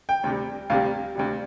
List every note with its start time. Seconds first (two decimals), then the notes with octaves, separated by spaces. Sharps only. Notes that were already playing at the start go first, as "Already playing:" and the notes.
0.09 G5
0.24 D2 C3 G3
0.70 D2 C3 G3 F5
1.15 D2 C3 G3